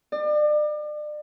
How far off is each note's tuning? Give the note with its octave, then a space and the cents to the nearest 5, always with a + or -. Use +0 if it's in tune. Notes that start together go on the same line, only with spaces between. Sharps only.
D5 +35